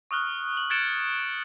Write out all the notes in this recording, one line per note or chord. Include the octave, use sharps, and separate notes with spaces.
C#6 D#6 F6 F#6
F#7
F#6 G#6 A6 C#7 D7 E7